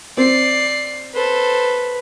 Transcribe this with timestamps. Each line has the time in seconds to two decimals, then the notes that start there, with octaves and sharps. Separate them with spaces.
0.17 C4 D5 C7
1.15 A4 B4 C5